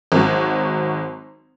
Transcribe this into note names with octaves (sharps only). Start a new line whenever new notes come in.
G#1 F#3